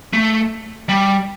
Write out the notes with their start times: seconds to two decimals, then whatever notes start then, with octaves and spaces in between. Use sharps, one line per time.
0.13 A3
0.89 G3